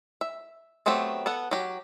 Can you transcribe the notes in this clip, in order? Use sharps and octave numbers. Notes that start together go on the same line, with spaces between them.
E5
F#3 A3 B3 C4 G4
B3 A4 F#5
F#3 G4